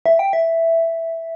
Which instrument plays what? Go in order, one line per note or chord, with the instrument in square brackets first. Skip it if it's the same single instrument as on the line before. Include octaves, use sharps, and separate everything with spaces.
[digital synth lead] E5
G5
E5